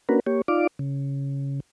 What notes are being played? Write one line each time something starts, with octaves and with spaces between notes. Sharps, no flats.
A#3 C#4 D4 F#4 A#4 B4
A#3 G4 C#5
D#4 F4 D5 F5 D6
C#3